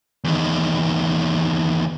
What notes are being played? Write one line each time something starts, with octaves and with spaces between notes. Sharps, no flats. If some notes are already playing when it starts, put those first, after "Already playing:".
E2 D#3